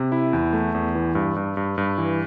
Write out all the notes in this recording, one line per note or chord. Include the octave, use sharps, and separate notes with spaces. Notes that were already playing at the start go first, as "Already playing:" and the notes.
Already playing: C3
E4
E2
A3
E2
E3
G2
G2
G2
G2
E3